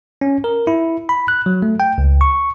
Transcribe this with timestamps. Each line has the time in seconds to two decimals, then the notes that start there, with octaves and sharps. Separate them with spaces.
0.21 C#4
0.44 A#4
0.67 E4
1.09 B5
1.28 F#6
1.46 F#3
1.62 A3
1.80 G5
1.98 C#2
2.21 C#6